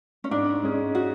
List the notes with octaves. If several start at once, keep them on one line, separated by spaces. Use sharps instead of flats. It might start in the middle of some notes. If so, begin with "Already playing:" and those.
C#4
G#2 D4
G#3 C#4 G#4
F#4